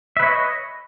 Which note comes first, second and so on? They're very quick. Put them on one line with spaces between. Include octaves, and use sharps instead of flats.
E5 B4 C#5 D#5